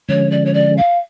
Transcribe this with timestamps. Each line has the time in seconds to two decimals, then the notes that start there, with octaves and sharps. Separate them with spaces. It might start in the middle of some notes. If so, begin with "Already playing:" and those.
0.09 D3 F3 G#3 C#4 C#5
0.31 D5
0.45 C#5
0.53 D5
0.77 F5